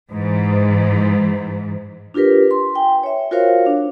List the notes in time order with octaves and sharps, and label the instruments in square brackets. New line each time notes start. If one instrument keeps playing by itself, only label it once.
[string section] G#2 E3
[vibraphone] D4 F4 G4 A#4 B4
C6
G5 G#5
C#5 E5
F4 F#4 A#4 C5 C#5 F5
D4